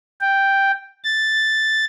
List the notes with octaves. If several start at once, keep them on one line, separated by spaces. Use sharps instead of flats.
G5
A6